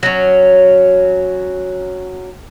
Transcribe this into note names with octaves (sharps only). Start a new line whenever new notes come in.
F#3 C#4